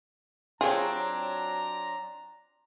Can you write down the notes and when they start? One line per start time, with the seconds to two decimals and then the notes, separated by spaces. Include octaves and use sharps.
0.61 F#3 C4 D4 F4 G4 G#4 C#5 A#5